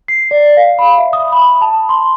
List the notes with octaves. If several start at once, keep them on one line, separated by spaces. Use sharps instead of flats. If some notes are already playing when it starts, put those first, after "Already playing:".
C7
D5
F5
B5
E5
D#6
B5
A5
C6